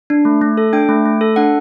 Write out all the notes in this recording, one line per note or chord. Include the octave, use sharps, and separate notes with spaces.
D4
A3
A3
A4
D4 G5
A3
A3
A4
D4 F#5